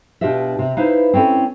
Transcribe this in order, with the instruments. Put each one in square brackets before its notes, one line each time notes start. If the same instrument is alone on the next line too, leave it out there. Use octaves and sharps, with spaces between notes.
[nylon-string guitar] B2 D4 F4 G4 D#5 E5
C3
D#4 E4 B4 C5 F5
C4 C#4 E4 A4